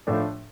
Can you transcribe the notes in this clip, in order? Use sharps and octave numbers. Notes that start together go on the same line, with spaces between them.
A2 F3 A3 D4